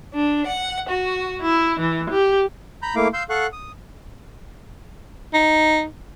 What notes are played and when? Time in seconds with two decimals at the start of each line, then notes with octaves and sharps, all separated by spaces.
0.14 D4
0.46 F#5
0.88 F#4
1.43 E4
1.80 E3
2.10 G4
2.82 A#5 B5 G6
2.96 A3 A#3 E4 F5 D6
3.14 F5 C6 E6 G6
3.30 A4 F5 F#5 C#6 F#6
3.52 D#6
5.34 D#4